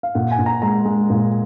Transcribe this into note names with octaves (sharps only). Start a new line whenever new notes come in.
F5
A#2 F#5
G#5
A#2
A#5
G#3 A#5
G#3
A#2